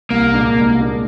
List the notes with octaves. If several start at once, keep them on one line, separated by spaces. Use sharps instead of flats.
C2 A#3
A#2 G#3 D4
C2
A#2 G#3 D4